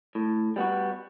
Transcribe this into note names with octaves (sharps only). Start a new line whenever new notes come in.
A2
G3 B3 F#4